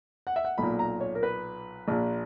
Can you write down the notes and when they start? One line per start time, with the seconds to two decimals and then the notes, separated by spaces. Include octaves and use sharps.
0.27 F#5
0.36 E5
0.45 F#5
0.58 B1 A#2 B5
0.79 A#5
1.01 C#5
1.15 A#4
1.23 B4
1.88 A#1 A#2